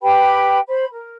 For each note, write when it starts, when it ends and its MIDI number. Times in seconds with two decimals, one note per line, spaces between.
0.02 0.58 67
0.02 0.58 71
0.02 0.58 79
0.02 0.58 83
0.67 0.85 72
0.67 0.85 83
0.92 1.17 70